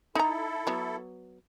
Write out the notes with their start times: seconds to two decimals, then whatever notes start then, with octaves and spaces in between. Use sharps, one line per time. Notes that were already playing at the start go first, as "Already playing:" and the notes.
0.15 D#4 E4 A4 A#5
0.67 F#3 B3